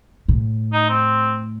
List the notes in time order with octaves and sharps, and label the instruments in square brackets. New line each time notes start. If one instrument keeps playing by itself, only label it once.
[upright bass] A2
[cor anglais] D#4
C4